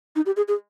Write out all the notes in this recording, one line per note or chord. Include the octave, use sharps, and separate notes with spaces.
D#4
G4
G#4
G#4